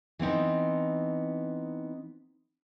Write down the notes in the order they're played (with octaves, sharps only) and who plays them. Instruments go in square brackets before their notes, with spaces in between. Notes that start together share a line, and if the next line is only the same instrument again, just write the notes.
[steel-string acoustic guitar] E3 B3 C4 D#4